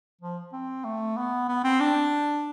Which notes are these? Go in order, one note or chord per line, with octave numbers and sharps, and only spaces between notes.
F3
C4
A3
B3
B3
C4
D4